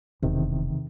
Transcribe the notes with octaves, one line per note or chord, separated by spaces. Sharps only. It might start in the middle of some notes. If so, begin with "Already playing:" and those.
E1 E2 C3 D#3